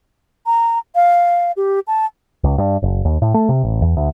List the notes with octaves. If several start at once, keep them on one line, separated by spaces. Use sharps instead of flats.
A#5
F5
G4
A5
C#2
G2
F#1
D#2
A2
A3
C3
A1
E2
D2